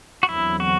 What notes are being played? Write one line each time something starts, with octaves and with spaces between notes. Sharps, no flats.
F#4
E2 D3 F#3 C4 E4
F#4